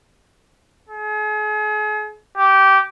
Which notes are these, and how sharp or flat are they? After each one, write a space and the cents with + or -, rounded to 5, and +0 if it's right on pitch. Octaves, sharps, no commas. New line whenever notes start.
G#4 +40
G4 -15